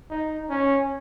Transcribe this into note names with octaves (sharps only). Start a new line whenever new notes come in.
D#4
C#4